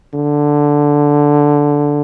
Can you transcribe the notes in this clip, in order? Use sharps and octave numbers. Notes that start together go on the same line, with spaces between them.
D3